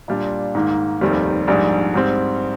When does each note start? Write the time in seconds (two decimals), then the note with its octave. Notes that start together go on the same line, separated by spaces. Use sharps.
0.08 A#2 G3 D4 F4
0.55 G#2 D#3 A#3
1.01 F1 D#2 D#3 G3 C4
1.47 A#1 G#2 G3 D4
1.94 G#2 G3 C4